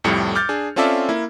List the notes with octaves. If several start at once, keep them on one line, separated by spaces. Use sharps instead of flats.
C2 F2 A2 G3 C#7
D6 F6 G6 A6
D4 G#4
C4 C#4 F4 A4 D5 E5
A#3 E4